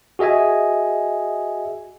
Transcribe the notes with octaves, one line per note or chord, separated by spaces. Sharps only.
F#4 G#4 D#5 E5 G#5